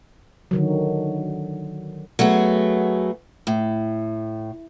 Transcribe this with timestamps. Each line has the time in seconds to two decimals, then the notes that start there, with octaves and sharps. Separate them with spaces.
0.51 D3 D#3 F#3
2.19 F#3 A3 B3 G#4
3.47 A2